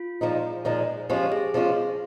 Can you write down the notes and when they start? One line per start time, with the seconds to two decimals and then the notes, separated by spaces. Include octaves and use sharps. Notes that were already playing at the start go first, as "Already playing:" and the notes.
Already playing: F4
0.21 A#2 F3 G#3 D#4
0.65 A#2 F3 G#3 D#4
1.10 F3 G#3 C#4 F4 G4
1.32 G#4
1.54 F3 G#3 C#4 F4